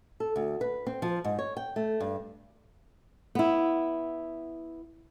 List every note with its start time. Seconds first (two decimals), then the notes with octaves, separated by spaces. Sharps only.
0.20 A4
0.36 D2
0.61 B4
0.87 C4
1.02 F3
1.24 G#2
1.39 C#5
1.57 G5
1.76 A3
2.00 G2
3.35 B3 E4